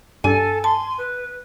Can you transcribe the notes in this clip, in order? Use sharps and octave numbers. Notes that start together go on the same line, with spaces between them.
G2 D4 A4 G#5
A5 C6
B4